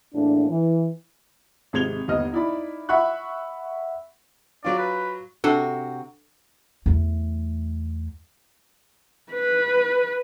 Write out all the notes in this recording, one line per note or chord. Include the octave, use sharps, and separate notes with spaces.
E2 A2 A#3 D4
E3
G#1 C3 G#3 G#6 F7 G7
G1 D#2 B3 D#5 F6
D#4 E4 D5 B5
E5 F#5 B5 C#6 F#6
F#3 F4 D5
B4
C3 D4 F#4 A4
E2 A3
B4